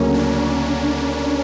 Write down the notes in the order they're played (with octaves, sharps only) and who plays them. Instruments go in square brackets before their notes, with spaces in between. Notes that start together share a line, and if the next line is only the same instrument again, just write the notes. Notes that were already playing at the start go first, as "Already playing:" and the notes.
Already playing: [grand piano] D2 C#3 F#3 A#3 [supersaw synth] C#4
[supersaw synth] D4